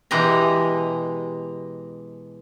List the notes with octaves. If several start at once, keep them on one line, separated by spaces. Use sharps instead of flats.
B2 E3 G#3 G4 A#5